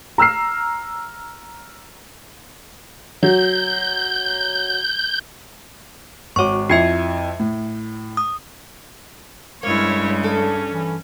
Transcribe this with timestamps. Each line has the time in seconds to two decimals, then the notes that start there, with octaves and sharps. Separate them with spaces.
0.18 A#5 E6 F6 C7
3.23 F#3 G6
6.36 G#1 F#4 C#5 C#6 D6
6.70 F2 E4 E5 G#6 C7 C#7
7.40 A2
8.17 D#6
9.63 G2 C#3 G#3 A#3 E4 C#5
10.23 C#4 D4 A4
10.68 E3